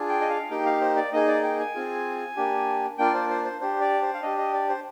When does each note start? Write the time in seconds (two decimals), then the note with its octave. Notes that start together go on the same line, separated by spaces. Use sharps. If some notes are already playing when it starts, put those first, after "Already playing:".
Already playing: D4 F4 G#4
0.09 G5
0.21 D#5
0.30 F5
0.50 A#3 D#4 G4 G5
0.66 F5
0.81 C5
0.96 D5
1.13 A#3 D#4 G#4 D#5
1.28 D5
1.43 G5
1.59 G#5
1.75 C4 F4 G#4
2.36 A#3 D4 G4
2.98 A#3 D4 F4 G5
3.14 C5
3.30 C5
3.45 C5
3.61 D4 G4 C5
3.81 D5
4.02 C5
4.14 F5
4.22 D4 G4 D#5
4.38 D#5
4.54 D5
4.69 C5